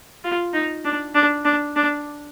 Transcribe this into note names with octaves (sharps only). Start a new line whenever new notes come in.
F4
D#4
D4
D4
D4
D4